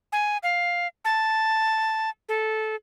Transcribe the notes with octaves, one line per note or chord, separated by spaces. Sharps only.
G#5
F5
A5
A4